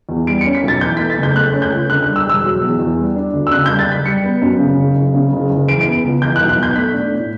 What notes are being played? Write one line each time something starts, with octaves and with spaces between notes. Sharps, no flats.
E2
G3 D7
C#7
C#4
B6
B1
A6
E3 G6
A3 B6
A6
F#1
G6
A3 F#6
C#4
G6
C#2
D3 F#6
G3 F#6
E6
E1 E6
F#3
E2
E2
G3
D4
D2
E6
C#3 F#6
G3 G6
A6
F#1 B6
G3 C#7
B3
F#2
C#3
F#1
F#1
C#3
F#1
F#1
E3 D7
D7
B3
C#2
E3 G6
F#6
B1
F#6
B1 G6
A3 B6
D4
A2